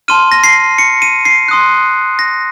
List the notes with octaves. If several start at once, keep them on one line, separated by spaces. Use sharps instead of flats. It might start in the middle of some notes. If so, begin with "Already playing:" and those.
A5 C6 F6 D#7
A#6
C7
C#7
D#7
C7
C6 D#6 F#6
A#6